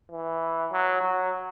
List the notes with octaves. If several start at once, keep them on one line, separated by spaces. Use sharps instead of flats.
E3
F#3
F#3